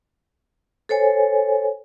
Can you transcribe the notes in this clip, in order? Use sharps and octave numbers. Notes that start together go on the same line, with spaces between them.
A4 C5 C#5 G#5